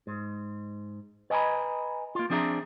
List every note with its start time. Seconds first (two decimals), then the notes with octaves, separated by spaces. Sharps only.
0.07 G#2
1.30 B4 D#5 G#5 A#5 B5
2.15 A#3 F4
2.30 F3 C4 D4 G#4 E5 A#5